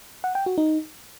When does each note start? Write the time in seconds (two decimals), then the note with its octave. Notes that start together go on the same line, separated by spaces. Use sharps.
0.24 F#5
0.35 G5
0.46 F#4
0.58 D#4